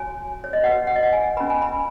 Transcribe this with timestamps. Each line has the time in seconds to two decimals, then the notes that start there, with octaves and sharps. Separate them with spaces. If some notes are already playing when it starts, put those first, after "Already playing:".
Already playing: F#4 C#5 G#5
0.44 C#5
0.53 D#5
0.63 F#4 B4 F#5
0.87 F#5
0.96 D#5
1.03 F#5
1.13 G#5
1.37 C#4 B4 B5
1.50 G#5
1.62 B5